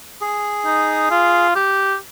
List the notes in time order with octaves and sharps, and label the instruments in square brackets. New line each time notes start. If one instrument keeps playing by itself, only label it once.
[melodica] G#4
[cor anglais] D#4
F4
G4